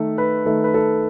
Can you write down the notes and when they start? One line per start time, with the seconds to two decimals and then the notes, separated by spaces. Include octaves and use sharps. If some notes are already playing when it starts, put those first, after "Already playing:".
Already playing: D#3 A3 A4
0.18 B4
0.45 D#3 A3 A4
0.64 B4
0.74 A4